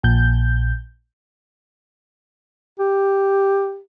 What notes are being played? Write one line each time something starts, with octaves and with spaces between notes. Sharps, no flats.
A#1 A#2 G6
G4